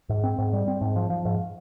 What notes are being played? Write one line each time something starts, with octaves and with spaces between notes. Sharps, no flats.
G#2
C4
G#2
G3
C4
G#2
F3
F3
G#2